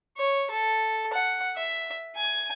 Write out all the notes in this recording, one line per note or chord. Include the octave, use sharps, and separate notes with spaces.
C#5
A4
F#5
E5
G#5